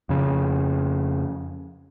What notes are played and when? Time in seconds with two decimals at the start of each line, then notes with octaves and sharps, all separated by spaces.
0.09 F2 C#3